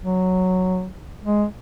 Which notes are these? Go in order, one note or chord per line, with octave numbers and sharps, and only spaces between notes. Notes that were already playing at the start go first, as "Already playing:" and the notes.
F#3
G#3